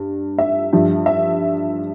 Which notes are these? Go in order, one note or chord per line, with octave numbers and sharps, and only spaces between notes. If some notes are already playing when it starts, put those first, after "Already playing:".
Already playing: G2
E5
G2 F3
E5